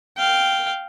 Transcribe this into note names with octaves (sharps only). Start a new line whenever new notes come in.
F5 G5